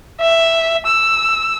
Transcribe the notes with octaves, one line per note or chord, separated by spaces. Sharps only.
E5
E6